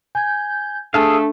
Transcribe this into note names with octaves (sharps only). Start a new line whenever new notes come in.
G#5 G6 G#6
A3 D4 G#4 A4 F5 E6